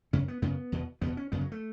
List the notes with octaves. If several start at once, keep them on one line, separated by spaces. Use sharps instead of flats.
F#2 C#3 C#4
B3
F#2 C#3 B3
E2 B2
E2 B2 B3
C#4
F#2 C#3 B3
F#3
A3